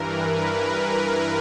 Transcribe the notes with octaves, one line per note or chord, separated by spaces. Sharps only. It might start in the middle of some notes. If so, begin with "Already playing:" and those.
Already playing: G2 E3 A#4 B4
A#4
A#4